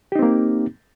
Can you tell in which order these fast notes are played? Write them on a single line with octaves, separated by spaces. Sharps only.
G4 D#4 C4 A#3